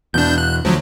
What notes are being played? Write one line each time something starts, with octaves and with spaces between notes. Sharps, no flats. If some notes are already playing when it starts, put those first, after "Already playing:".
E2 B2 D4 G6
F#6
D2 F3 F#3